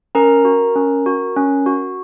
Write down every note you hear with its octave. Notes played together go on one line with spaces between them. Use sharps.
C#4 A#4 A#5
F#4
C#4
F#4
C#4
F#4